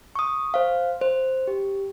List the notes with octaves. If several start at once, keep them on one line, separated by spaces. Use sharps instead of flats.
C#6 D#6
C5 F5
C5
G4